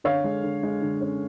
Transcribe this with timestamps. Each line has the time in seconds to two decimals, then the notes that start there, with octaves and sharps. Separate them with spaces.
0.04 D3 C#5 F5
0.24 G#3
0.43 D3
0.63 G#3
0.81 D3
1.01 C#4